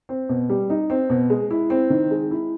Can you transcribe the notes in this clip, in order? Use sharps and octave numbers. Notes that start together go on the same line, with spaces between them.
C4
B2
G3
D#4
C4
B2
G#3
E4
C4
D#3
G#3
E4